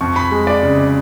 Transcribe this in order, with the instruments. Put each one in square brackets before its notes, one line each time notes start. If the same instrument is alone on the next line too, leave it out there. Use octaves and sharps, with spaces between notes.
[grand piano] F2 C#6
B5
G#3
D5
C#3
D5